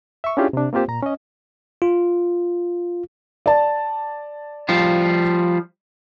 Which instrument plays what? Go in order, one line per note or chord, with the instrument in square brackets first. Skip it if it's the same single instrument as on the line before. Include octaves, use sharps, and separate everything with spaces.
[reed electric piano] E5 C#6
C#4 D4 E4 F4 G4 G#4
C3 D4
A#3 C4 F4 G4 C5
A#2 A#5
C#4 D#5
[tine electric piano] F4
[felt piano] D5 A5
[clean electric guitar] F3 G3 F4